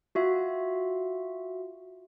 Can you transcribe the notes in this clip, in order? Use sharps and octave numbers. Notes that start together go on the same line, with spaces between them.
F4 F#4 E5